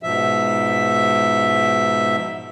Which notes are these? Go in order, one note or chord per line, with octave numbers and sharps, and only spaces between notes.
G#2 B2 F3 E5